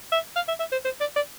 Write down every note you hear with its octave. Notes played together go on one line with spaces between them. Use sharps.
E5
F5
E5
E5
C5
C5
D5
D5